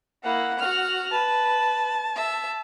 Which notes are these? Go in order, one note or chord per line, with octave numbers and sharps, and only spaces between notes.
A#3 E4 F#5
F#4 F6
B4 A5
E5